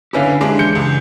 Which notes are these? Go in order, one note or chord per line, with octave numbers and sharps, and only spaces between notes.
D3 C#4 E4 G4 B4 F5
G#3 D4 G4
E3 G6 C#7
C#2